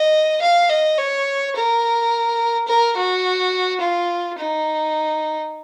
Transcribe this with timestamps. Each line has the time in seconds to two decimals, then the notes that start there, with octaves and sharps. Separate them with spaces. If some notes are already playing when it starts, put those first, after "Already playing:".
Already playing: D#5
0.42 F5
0.70 D#5
0.98 C#5
1.55 A#4
2.68 A#4
2.97 F#4
3.81 F4
4.38 D#4